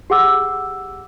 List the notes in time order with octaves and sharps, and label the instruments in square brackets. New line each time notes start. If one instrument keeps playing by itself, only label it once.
[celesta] G4 G#4 F#5 D6 E6